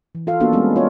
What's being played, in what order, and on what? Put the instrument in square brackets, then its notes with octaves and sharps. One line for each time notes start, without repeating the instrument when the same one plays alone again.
[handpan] E3
F4 A4 F5
A#3 B3 D4 F#4 A4
G3 G#3 B3 C#4
F4 C#5 D5